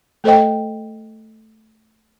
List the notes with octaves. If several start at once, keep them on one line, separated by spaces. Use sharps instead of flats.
A3 A4 C5 D#5 G5